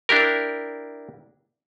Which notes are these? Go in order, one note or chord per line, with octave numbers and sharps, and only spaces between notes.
D4 E4 G4 A#4